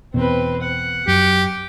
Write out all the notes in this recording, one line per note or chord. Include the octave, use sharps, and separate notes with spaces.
E2 B2 C4 B4
F#5
F#2 G4